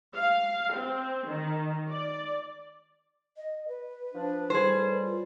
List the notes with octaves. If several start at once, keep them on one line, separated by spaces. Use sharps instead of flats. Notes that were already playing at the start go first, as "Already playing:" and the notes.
F5
C4
D#3
D5
D#5
B4
F3 D4
A2 G3 G#4 C5
F4